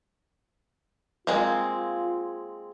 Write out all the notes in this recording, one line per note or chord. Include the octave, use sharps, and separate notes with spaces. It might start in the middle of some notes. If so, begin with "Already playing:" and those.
G#3 A#3 C4 F4